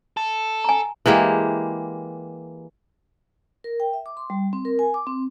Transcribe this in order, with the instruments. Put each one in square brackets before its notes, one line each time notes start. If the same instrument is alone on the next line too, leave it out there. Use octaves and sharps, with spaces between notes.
[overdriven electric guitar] A4
[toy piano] G#5 A#5
[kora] E3 G#3 A#3 G4
[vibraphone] A#4
G5
E5
D6
C6
G3
C4
A#4
G#5
D6
C4